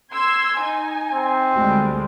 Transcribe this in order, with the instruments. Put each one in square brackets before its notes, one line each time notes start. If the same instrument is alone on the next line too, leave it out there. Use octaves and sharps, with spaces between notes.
[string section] C6 E6 G#6
D#4 G#5
[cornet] C4
[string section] D2 G3 G#3